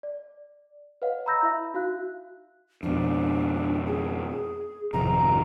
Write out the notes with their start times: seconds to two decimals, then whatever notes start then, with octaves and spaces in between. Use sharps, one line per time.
0.03 D5
1.02 B4 C#5 D#5 F5 F#5
1.26 A#5 B5 E6 G6 A#6
1.43 E4 E5
1.74 D#4 F#4 F5 F#6
2.83 F2 B2 D4
3.86 G#4
4.93 G#1 F2 C3 A#5